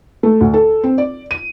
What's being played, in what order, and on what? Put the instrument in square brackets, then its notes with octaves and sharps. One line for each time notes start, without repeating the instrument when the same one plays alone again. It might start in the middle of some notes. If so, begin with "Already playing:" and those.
[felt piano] A3
D2
A4
C4
D5
D#7